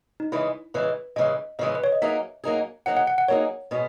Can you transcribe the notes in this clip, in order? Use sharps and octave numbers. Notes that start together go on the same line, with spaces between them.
D#4
C#3 E3 G#3 E4
C#3 E3 G#3 B4
C#3 E3 G#3 D#5
C#3 E3 G#3 D#5
B4
C#5
D#5
F#3 A#3 D#4 G#4 E5
F#3 A#3 D#4 G#4
F#3 A#3 D#4 G#4 F#5
F#5
F#5
F#5
F#3 A#3 D#4 G#4 C#5
B2 G#3 C#4